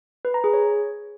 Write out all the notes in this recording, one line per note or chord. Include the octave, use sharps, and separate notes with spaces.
B4
A#5
G#4
C#5